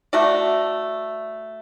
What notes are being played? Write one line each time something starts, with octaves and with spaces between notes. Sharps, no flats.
A3 F#4 D5